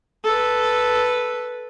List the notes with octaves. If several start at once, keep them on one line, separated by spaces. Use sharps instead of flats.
A4 B4